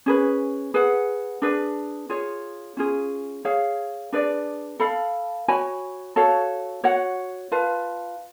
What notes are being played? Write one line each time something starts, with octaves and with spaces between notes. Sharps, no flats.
C#4 G#4 B4
G#4 B4 F#5
D4 G#4 B4
F4 G#4 C#5
C#4 F4 G#4
G#4 C#5 F5
D4 G#4 B4 D5
A4 F5 B5
F#4 C#5 G#5 B5
F#4 A4 C#5 F5
F#4 C#5 F#5
F4 B4 F5 A5